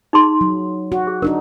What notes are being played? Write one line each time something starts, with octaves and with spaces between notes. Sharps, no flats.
D#4 G#4 C6
F#3
F#4
G#4
D4 D#4 F#4 A#4